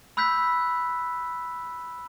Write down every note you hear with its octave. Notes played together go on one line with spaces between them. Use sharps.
B5 E6 F#6 G6 B6